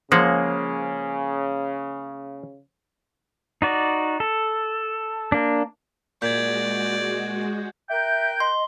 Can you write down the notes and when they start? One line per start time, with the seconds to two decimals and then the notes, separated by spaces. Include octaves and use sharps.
0.12 C#3 F3 G#3 A#3 F#5
3.62 D#4 F#4 D5
4.20 A4
5.32 A#3 D4
6.22 A#2 G#3 F#4 D5 G6 G#6
7.90 A#4 E5 G5 F#6 G6
8.40 D#5 C6